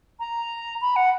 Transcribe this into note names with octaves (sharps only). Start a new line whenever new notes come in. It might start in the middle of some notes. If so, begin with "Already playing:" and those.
A#5
B5
F#5